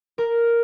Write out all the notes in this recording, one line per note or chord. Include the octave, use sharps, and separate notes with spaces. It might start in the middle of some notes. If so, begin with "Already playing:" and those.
A#4